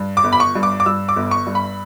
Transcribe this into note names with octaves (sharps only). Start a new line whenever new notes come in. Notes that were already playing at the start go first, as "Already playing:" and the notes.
Already playing: G2
D6
G1
B5
C#6
G2
D6
D6
G2 E6
D6
G1
C#6
G2
B5